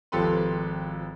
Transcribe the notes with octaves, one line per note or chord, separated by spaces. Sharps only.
G#1 F3 G4 A4 B4 C6